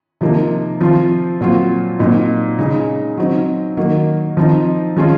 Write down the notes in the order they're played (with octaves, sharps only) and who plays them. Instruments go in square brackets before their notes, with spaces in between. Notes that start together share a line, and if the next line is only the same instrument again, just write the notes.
[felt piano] C3 F3 A#3 D#4
F3 C4 F4
A#2 F#3 C4 F4
A#2 F#3 C4 D#4
C#3 G#3 D#4
F#3 C4 D#4
D#3 F#3 A#3
F3 C4 D#4
F3 G#3 C#4 F4